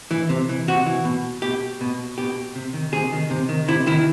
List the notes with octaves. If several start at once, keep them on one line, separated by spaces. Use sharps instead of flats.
E3
C3
E3
C3 F#4
E3
B2
B2 G4
B2
B2 G4
C3
D#3
C3 G#4
D#3
C3
D#3
C3 E4
D#3 E4